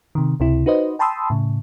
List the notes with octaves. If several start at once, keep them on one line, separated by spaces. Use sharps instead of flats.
C3 D#3
C#2 C3 E4
D#4 F#4 B4 C5 D#5
G5 A5 B5 C6 D#6 E6
A2 C#3